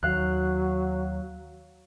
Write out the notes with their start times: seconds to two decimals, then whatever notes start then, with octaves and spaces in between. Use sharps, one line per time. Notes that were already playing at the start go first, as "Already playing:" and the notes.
0.03 D#2 F#3 F5 F#6